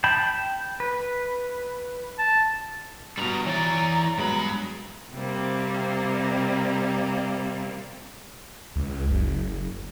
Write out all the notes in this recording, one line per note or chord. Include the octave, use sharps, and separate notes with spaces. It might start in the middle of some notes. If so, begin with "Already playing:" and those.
G5 A5 B5
B4
A5
G2 B2 G3 A#5
E3 C#5 D5 A#5
G2 F#3 G#3 B3 B5
C3 G3 A#3 C4
C#2
F#1